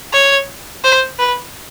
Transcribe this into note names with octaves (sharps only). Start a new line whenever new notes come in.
C#5
C5
B4